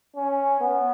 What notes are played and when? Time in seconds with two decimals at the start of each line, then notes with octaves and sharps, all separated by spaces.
0.16 C#4
0.60 B3